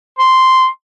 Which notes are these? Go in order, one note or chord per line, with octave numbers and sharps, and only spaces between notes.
C6